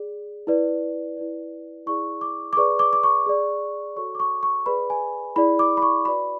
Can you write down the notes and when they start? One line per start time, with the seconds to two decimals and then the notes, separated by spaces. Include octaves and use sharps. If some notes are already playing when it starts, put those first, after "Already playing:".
Already playing: G#4 D5
0.47 E4 B4 D5
1.17 E4 B4 D5
1.86 E4 G#4 D5 C#6
2.21 D6
2.53 D6
2.57 G#4 B4 D5 C#6
2.79 D6
2.93 D6
3.04 C#6
3.26 G#4 D5
3.96 F#4 A4 C#5 C#6
4.15 D6
4.20 C#6
4.43 C#6
4.66 G#4 B4 D5 B5
4.90 G#5
5.36 E4 G#4 D5 B5
5.59 D6
5.77 B5
5.82 C#6
6.05 F#4 B4 D5 B5